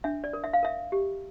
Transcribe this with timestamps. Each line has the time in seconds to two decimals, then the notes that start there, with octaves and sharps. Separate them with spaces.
0.04 D4 E5
0.24 D5
0.33 A#4
0.44 E5
0.53 F5
0.63 A#4 E5
0.92 G4